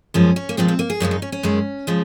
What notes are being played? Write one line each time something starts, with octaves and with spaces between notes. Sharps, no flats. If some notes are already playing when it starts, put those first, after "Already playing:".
F#2 F3 G#3 C#4
C#4
A#3
A#2 F3 G#3 C4
C4
A#3
G#4
F#2 C#3 F3 G#3
D#4
C#4
C#4
F#2 D#3 G#3
C#3 F3 G#3